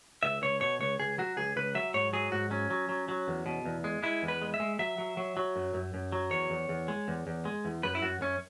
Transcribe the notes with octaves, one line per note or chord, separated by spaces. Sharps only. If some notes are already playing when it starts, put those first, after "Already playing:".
C#2 E5
C#2 C#5
B2 C#5
C#2 C#5
C#2 G#4
F#3 F#4
C#2 G#4
C#2 B4
F#3 E5
G#2 C#5
F#3 G#4
G#2 F#4
F#3 C#4
F#3
F#3
F#3
E2
B2
E2
G#3
G#3 E4
E2
B4
G#3
E5
G#3
F#3 E5
F#3
F#3
F#3
F#2
F#2
F#2
F#3
E2 C#5
E2
E2
G#3
E2
E2
G#3
E2
F#2 B4
E4
F#2 F#4
F#2 C#4